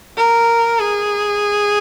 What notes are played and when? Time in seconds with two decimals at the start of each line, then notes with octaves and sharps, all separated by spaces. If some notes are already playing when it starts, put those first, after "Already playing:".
0.17 A#4
0.79 G#4